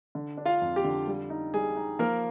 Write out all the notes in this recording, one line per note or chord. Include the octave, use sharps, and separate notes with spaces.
D3
D4
F4 F5
F2
G4
D3
G3
D#4
G3 G#4
D#4
F3 A#3 A#4